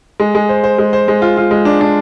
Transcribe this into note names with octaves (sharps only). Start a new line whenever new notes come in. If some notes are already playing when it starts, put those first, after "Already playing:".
G#3
G#3
C5
C5
G#3
C5
G#3
F4
F4
G#3
D4
D4